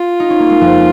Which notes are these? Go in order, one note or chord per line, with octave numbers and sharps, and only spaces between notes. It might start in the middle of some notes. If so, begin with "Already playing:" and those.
Already playing: F4
D#4
C#4
A#3
G#3
F2 F3